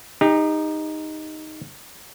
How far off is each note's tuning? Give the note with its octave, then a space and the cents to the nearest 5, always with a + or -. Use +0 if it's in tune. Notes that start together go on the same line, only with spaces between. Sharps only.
D#4 +0 G4 +40